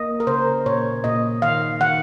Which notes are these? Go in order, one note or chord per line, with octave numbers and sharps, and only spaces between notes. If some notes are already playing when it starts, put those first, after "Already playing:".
Already playing: A#3 D#5
A#4
C#3 C5
A#2 C#5
A#2 D#5
D#3 F5
D#3 F#5